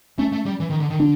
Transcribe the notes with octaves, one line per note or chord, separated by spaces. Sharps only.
A3 C#4
A3
G3
E3
D#3
D3
D#3
D3 D4